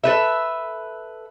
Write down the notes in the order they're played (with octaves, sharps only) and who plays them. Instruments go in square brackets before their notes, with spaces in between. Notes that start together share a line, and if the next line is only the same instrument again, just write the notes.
[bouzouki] A4 B4 E5